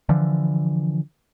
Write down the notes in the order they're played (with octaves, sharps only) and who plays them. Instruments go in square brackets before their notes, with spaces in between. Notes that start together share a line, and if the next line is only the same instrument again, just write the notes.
[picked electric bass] D3 E3 F3